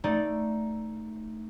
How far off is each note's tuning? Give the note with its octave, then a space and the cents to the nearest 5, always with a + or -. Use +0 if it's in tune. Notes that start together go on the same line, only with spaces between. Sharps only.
A3 +0 D#4 +0 D5 +0